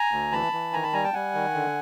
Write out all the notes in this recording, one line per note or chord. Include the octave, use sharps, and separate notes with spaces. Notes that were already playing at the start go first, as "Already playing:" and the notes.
Already playing: G#5 A#5
D2
E3 A5 B5
E3
D#3 G#5 A#5
A5 B5
G3 G#5 A#5
G5 A5
G3 F#5 G#5
D#3
D3